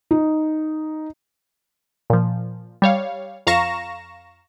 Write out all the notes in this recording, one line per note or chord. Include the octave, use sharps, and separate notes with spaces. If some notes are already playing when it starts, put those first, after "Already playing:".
D#4
A#2 F3
G3 C#5 F5
F2 F5 A#5 C#6 A#6 E7